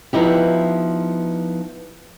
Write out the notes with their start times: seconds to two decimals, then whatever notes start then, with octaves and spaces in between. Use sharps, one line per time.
0.13 F3 B3 D#4 E4 G4